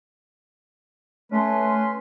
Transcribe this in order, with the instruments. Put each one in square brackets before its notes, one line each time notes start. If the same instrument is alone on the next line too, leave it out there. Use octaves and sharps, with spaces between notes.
[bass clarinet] A3 [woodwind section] C#4 B4 C6